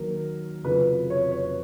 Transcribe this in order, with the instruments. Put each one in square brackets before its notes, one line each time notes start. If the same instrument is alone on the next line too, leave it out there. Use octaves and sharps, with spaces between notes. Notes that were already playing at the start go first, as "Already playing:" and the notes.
Already playing: [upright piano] D#2 D#3 F#3 A#4
F1 F2 C#3 F#3 B4
C#5
C#5